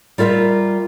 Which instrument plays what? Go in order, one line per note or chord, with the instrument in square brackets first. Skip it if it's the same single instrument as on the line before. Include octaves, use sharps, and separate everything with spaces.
[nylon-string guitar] G3 F4 A#4 E5 F5